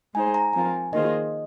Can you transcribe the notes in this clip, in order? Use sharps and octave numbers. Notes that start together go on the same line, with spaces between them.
G#3 D#4 G#4 C5 G#5
A#5
F3 C4 F4 A#4 G#5
D#3 A#3 F4 G#4 C5 D#5